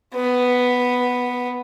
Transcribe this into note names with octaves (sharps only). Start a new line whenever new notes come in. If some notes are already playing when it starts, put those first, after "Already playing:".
B3